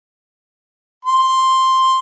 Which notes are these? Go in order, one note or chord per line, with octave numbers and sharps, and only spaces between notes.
C6